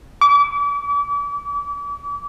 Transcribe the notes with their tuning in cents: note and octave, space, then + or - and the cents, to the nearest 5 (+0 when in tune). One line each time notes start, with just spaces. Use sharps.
D6 -35